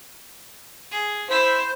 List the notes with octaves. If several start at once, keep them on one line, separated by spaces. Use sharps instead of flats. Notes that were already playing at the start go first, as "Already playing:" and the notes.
G#4
E4 C5